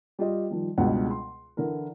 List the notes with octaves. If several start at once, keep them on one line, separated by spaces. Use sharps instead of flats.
G3 F4 G4 D#5
D#3 F3 G3
C#2 B2 G3 G#3 D4 F#5
C6
D3 E3 E4 A#4